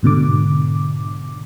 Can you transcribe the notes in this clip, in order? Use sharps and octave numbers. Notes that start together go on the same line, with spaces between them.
G#2 B2 D3 D6